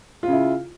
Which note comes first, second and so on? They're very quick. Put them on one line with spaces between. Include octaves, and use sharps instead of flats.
F4 C#3 E4